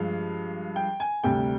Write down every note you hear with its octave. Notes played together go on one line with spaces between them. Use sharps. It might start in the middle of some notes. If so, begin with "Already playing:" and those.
Already playing: G2 F3 G#3 F5
G5
G#5
D2 C3 G3 G5